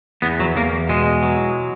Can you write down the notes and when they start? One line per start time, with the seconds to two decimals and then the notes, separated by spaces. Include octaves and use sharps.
0.22 E2 B3
0.40 F#3
0.56 E2 A#3
0.89 B2 G#3
1.23 F#3